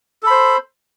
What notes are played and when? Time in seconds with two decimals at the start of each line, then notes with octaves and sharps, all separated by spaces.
0.23 A4
0.27 B5
0.30 C5